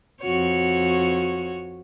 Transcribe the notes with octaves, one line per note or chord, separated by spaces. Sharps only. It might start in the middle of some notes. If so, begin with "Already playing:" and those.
F2 F#4 C#5